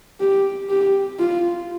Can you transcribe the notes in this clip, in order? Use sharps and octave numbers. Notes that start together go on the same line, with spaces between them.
G4
G4
F4